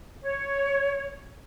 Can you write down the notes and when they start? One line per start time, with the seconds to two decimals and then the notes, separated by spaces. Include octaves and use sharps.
0.22 C#5